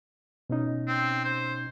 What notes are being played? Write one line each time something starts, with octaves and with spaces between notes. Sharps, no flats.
B2 C#4 D#4
C4
C5